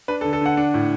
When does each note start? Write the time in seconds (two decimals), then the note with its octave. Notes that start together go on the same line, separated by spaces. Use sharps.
0.08 D4 B4
0.21 A4
0.25 D3
0.33 A4
0.41 D3 F#5
0.57 D4
0.74 A2